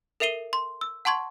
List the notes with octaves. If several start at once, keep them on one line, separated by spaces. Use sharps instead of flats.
A4 A#4 E5 C7 D#7 G7
C6
E6
F#5 A5 C6 C#6 G#6